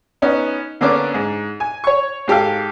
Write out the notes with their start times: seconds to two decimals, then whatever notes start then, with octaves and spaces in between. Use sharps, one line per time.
0.22 B3 C#4 D#4
0.81 D3 A#3 B3 C#4 D4 D6
1.14 G#2
1.60 G#5
1.84 C#5 C#6
2.28 G#2 G4 A4 F5